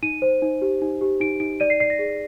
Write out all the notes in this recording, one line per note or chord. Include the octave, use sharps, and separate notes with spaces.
D#4 D#7
C5
D#4
G4
D#4
G4
D#4 D7
D#4 D7
D5 D#7
C7
D5 C7
A#6
G#4